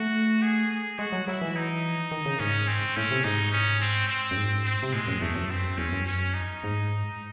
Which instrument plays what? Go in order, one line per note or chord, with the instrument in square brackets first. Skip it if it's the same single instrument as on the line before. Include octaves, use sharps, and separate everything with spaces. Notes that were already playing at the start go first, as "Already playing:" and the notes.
Already playing: [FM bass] A3 [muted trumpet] F#4
[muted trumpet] G#4
G#4
[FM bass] G#3 [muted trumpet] F#4
[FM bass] F#3
[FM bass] F#3 [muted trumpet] E4
[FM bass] E3
[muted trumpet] D#4
[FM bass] D#3
C#3
[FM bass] G#2 [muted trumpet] C#4
[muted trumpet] C4
[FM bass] A2 [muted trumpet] C#4
[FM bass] C3
[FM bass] G#2 [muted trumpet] D#4
[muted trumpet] C#4
C4
C4
[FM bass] F#2
G#2
[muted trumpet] C4
[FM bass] C3
[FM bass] A2 [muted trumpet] G#3
[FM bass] F#2
[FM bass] E2 [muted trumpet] A3
[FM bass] F#2
[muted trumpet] C4
[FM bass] E2 [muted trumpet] C#4
[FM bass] F#2
[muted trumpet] C#4
D#4
[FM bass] G#2